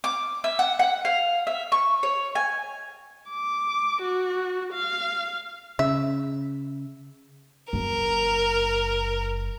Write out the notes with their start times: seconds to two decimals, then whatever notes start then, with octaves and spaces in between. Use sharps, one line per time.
0.04 D6
0.44 E5
0.59 F#5
0.79 F#5
1.05 F5
1.47 E5
1.72 C#6
2.03 C#5
2.35 G#5
3.30 D6
4.02 F#4
4.74 F5
5.79 C#3 E5
7.73 F#1 A#4